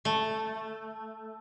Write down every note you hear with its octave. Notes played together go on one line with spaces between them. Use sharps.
A3